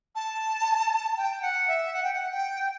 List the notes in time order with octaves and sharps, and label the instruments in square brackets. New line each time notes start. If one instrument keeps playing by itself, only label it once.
[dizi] A5
G5
F#5
E5
F#5
G5
F#5
G5